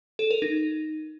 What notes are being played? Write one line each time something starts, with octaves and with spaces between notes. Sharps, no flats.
A4
A#4
D#4